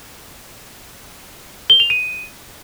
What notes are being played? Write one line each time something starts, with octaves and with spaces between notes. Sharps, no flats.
G7
F7
D#7